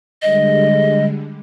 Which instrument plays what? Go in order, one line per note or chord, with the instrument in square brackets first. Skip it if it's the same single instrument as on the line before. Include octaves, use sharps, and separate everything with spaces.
[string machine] D3 G3 G#3 [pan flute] D#5